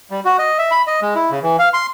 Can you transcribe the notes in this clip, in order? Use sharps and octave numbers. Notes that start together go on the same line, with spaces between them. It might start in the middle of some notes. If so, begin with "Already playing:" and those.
G3
F#4
D#5
E5
B5
D#5
G#3
E4
C#3
E3
F5
C6